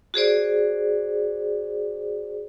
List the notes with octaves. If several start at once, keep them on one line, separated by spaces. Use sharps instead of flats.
F#4 G#4 C5 D5